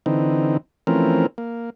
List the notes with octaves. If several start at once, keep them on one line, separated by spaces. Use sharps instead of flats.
D3 E3 C4 D#4
E3 F3 A3 C4 C#4 A#4
A#3